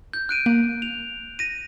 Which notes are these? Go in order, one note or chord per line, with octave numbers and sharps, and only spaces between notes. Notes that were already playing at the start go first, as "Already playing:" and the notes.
G6
F#6 D7 D#7
A#3
F7
A#6 D#7